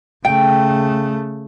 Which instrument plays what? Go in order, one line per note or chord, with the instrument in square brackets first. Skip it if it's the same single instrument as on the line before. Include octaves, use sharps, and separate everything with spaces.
[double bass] C#3 A3 [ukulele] G5